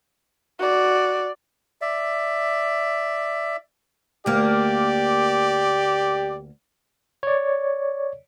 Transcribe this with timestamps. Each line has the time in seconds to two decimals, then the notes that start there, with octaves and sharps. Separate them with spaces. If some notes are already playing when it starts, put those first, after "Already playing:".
0.59 F#4 D5
1.81 D5 E5
4.26 D2 A#3 G4 D5
7.23 C#5 D5